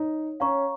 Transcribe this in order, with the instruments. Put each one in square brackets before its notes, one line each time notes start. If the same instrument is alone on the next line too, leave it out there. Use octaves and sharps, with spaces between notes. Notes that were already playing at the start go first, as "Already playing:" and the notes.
Already playing: [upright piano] D#4 [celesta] C#5
[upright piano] C#4 [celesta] C#5 F5 A#5 C#6